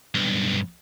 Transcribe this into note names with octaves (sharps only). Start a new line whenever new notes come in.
B1 G2